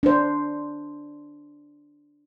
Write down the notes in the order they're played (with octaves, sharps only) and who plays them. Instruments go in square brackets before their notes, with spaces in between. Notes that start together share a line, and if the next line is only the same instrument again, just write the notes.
[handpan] D4 C5